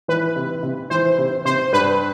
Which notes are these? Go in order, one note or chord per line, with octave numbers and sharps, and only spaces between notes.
E3 B4
C3
C3
E3 C5
C3
C3 C5
G2 B4